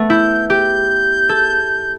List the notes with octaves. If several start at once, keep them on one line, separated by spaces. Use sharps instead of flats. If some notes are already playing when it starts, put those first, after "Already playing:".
Already playing: A3 B3
E4 G6
G4 G6
A4